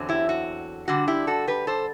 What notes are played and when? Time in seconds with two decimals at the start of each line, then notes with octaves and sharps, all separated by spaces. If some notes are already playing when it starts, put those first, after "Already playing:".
Already playing: E2 D3 F#3 C4
0.09 E4 G4
0.29 F#4
0.88 D3 G3 D4 F#4
1.08 E4 G4
1.27 F#4 A4
1.48 G4 B4
1.67 A4 C5